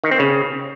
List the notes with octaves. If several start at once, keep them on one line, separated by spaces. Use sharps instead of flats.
D#3
C4
C#3